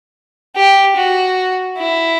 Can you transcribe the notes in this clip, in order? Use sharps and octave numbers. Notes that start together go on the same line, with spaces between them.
G4
F#4
E4